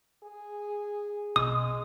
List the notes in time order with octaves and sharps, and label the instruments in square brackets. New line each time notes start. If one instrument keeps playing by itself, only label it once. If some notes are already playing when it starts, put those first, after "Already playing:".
[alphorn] G#4
[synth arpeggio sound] A#1 B2 [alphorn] G#3 [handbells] D#6